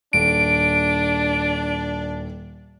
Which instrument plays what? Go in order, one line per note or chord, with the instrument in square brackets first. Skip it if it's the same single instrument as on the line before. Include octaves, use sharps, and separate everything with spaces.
[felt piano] D#1 [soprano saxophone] D4 [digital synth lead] D7